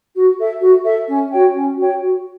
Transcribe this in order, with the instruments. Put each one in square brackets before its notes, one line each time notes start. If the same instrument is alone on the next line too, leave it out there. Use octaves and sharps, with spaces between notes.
[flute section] F#4
A4 E5
F#4
A4 E5
C#4
F#4 C#5 G5
C#4
F#4 C#5 G5
F#4